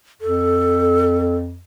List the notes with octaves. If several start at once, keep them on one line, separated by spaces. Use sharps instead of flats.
F2 A4